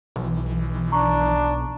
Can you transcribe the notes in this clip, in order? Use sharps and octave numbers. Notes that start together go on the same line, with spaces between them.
B1 E3
D4 A#5 C#6